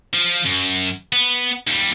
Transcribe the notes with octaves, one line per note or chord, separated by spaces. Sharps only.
F3
F#2
B3
D#2 G3